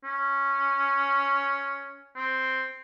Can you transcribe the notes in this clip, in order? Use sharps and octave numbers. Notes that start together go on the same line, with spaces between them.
C#4
C4